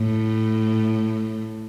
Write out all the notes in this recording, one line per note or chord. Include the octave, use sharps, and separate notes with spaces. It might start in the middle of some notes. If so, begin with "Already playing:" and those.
Already playing: A2